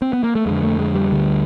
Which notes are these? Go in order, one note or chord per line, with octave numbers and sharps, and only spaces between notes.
C4
B3
A#3
A3
F2 D3 G#3
A3
G#3
G3
D2 D3